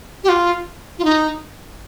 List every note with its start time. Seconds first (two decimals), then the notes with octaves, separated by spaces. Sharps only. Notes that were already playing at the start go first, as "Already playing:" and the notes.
0.24 G4
0.29 F4
0.99 F4
1.04 D#4